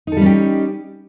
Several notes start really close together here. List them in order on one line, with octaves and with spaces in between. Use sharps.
D#4 A4 G3 C#4 G4